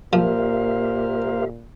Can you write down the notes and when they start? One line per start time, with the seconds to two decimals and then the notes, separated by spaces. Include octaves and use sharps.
0.13 A#2 F3 A#3 G4 A#4 C5 E5 F5